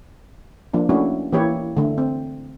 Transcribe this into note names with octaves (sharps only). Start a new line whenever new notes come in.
F3 A#3 D4
A3 A#3 C#4 D4 E4 F#4
E3 A#3 E4 G4 C#5
D3 A3
C4